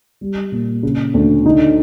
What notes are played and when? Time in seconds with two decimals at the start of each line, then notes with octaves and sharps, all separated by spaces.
0.21 G3
0.52 A#2
0.83 C#3
1.14 D2
1.45 D3 D#4